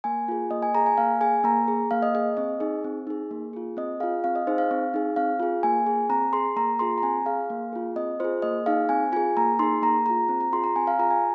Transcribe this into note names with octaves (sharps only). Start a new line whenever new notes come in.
A#3 G#5
F4 G#4
A#3 D#5
G#5
G#4 A#5
G#5
A#3 F5
G#4 G#5
A#3 A#5
G#4
A#3 F5
D#5
G#4 D#5
C4 D#5
D#4 G#4
C4
D#4 G#4
A#3
F4 G#4
C4 D#5
F4 G#4 F5
C4 F5
D#5
D#4 G#4 C5
F5
C4
D#4 G#4
C4 F5
F4 G#4
A#3 G#5
G#4
C4 A#5
G#4 C6
A#3 A#5
F4 G#4 C6
A#5
C4 G#5
G#4 F5
A#3
F4 G#4
C4 D#5
F4 G#4 C5
A#3 D#5
D#4 G#4 F5
C4 G#5
F4 G#4 G#5
A#3 A#5
D#4 G#4 C6
A#3 A#5
F4 G#4 A#5
C4
A#5
F4 G#4 C6
A#5
C4 G#5
F5
F4 G#4 A#5
G#5